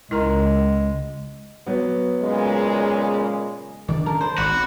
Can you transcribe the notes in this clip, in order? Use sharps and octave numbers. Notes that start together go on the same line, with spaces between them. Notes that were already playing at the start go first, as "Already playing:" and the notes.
C#2 G#3 E4 A#4 A#5
F#3 B3
A#2 C#3 G#3
D#3 D4 D5
C#4 A#4 A5
C5 B5
G#1 F#4 C5 D5
B3 C4